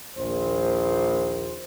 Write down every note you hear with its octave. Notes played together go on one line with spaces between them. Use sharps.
A#1 D#2 C5